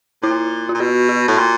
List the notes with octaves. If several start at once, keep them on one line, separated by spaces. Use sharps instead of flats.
A#2 E4
F4
A#2
B2 F#4
F#4
A2
A#2